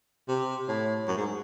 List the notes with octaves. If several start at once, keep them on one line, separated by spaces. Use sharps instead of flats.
C3
A2
F#2
G#2